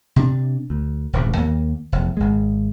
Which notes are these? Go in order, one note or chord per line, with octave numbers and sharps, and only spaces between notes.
C3 D4
D2
D#1 C2 G#2
D#2 A#3
F1 E2
G#1 G#3